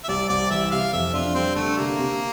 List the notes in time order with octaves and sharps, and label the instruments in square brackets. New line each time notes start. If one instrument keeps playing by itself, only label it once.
[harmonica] E5
[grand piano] C2 [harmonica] D5
[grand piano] C2 [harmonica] D5
[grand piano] E3 [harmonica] E5
[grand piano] C3 [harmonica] F5
[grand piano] F2 [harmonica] E5
[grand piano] D4 [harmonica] F4
[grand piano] G3 [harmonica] C4
[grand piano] D3 [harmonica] A3
[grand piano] C3 [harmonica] A#3
[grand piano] C3